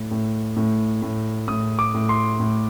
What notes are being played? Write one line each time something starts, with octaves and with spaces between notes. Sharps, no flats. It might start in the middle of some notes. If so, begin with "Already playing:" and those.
Already playing: A2
A2
A2
A2
A2 D#6
D6
A2
C6
A2